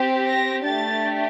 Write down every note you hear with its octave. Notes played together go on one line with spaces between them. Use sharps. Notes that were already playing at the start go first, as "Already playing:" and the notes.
Already playing: C4 G4
A#6
A3 D4 G4 A6